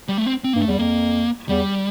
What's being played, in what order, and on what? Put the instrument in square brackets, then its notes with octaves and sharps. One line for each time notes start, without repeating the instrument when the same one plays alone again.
[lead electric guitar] G3
A3
C4
C4
[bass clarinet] G2 [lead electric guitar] A#3
[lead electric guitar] A3
[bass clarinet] E2 [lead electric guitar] G3
[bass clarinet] F2 [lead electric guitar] A#3
[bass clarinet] E2 [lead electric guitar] G3